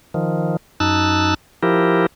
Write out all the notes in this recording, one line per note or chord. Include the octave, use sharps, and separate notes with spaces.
D#3 F3
F#2 D#4 A5 E6 F#6
F3 E4 G4 A#4